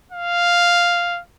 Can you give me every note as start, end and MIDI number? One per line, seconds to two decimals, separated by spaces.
0.12 1.20 77